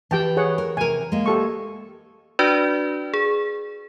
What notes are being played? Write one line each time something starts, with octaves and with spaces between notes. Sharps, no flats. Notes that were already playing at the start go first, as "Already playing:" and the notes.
E3 G4 G5 A5
G#4 C#5 F#5
A#4
C3 A#4 G#5
G#3 A#3
G4 A4 C#6
D4 F#4 B4 D5
G#4